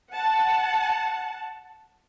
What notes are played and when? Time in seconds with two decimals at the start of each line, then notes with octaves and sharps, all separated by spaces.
0.11 F#5 A5